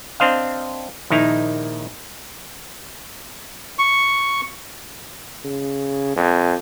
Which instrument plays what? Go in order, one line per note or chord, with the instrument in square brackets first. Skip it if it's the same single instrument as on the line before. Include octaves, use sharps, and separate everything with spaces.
[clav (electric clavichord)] C4 D4 C5 D#5 F5
A#1 D#3 D#4 E4 A#5
[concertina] C#6
[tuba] C#3
F2